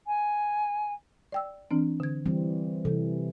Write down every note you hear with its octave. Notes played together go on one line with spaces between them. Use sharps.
G#5
D5 G5 E6
E3 C4 D4
D3 G#6
E3 G3 C4
C3 E3 A4